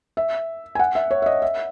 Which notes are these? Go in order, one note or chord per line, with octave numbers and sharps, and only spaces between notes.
E5
G#5
F#5
E5
C#5
E5
D#5
E5